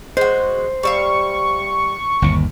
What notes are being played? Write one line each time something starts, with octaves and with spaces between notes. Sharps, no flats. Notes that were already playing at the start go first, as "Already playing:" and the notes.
G#3 F#4 C5
G3 E5 F5 C#6
G1 D#2